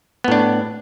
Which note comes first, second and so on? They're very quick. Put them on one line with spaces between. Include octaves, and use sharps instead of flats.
B3 A2 D4